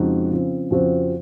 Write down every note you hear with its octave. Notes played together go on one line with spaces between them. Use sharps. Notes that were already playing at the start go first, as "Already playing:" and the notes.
Already playing: F2 C#3 G#3 D#4 F#4
C#3 F3 C4
F2 C#3 F3 C4 F#4